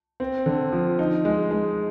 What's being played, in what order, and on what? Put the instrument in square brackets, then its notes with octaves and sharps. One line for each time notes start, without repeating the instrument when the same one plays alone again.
[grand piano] C4
D3
F3
D#4
G#3
G#3